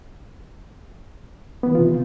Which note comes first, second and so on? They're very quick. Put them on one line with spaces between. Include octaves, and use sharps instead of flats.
B3 D#3 E3 F4 C3